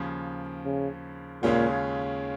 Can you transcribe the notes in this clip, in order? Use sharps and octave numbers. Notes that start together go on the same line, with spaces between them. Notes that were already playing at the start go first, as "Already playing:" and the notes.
Already playing: D#2 C#3 F3
C#3
D#2 A#2 C#3 G#3 C#4 F4